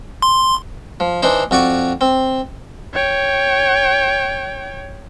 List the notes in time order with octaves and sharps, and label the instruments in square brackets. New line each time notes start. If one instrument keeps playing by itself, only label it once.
[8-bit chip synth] C6
[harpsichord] F3
E3 D4 D#4 C5
F2 F#4 D5 C#6
C4
[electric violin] C#5 G5